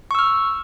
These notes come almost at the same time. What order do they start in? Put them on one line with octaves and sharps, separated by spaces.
C#6 E6 F6